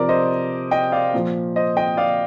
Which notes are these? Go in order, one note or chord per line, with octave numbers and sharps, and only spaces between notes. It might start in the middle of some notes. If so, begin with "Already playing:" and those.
Already playing: C3 F3 A#4 D5
C5 D#5
D#5 G5
D5 F5
A#2 F3
C5 D#5
D#5 G5
D5 F5